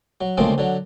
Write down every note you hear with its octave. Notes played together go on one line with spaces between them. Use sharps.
F#3
D2 C#3 F3 G#3 A#3 C4
D3 F#3